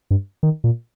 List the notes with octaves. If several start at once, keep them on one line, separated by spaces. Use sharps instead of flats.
G2
D#3
A#2